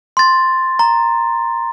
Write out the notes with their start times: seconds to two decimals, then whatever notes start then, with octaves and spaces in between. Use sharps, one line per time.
0.17 C6 A6
0.79 A#5